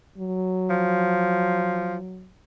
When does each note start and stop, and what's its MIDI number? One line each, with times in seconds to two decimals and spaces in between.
0.18 2.28 54
0.70 1.96 53